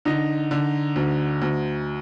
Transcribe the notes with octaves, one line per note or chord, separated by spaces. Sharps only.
D3 D#4
D3
D2
D2